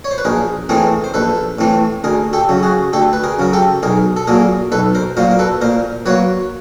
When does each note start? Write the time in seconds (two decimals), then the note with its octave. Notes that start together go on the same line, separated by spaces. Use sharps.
0.04 C#5
0.11 C5
0.18 B4
0.25 A#1 G#4 A#4
0.69 A2 E3 A3 C4 G#4 A#4
1.04 C5
1.14 A#1 A4 B4
1.59 A2 E3 A3 C4
2.04 D2 G#4 A#4
2.33 G4 A4
2.49 C#3 F#3
2.63 F#4 G#4
2.93 D2 G4 A4
3.13 B4
3.24 G#4 A#4
3.39 C#3 F#3 A#4
3.53 G4 A4
3.83 B1 G#4 A#4
4.16 A4
4.27 A#2 F#3 A#3 G#4 A#4
4.72 B1 A4 B4
4.95 A#4 C5
5.17 A#2 F#3 A#3 A#4 C5
5.31 A#4
5.39 A4 B4
5.61 A#2 A#4 C5
6.06 F#3 A#3 B4 C#5